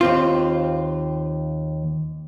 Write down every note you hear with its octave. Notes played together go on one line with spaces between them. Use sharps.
D#2 C4 F4